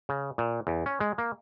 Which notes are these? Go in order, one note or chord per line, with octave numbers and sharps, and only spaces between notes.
C#3
A#2
E2
C#4
G#3
A#3